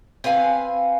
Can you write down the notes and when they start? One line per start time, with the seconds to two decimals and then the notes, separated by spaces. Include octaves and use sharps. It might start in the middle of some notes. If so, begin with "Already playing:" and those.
0.24 C4 B4 F5 G#5